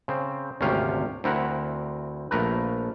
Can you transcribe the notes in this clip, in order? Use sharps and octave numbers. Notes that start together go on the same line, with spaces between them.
C#3 C4
G#1 D2 C3 C#4 F5 G5
D2 C4 E4 A#4 F#5
A#1 A3 A#4 B4